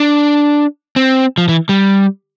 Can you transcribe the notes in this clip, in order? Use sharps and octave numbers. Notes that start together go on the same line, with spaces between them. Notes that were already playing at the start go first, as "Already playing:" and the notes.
Already playing: D4
C4
F3
E3
G3